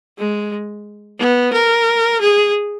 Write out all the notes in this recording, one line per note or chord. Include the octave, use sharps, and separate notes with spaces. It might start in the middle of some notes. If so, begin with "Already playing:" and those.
G#3
B3
A#4
G#4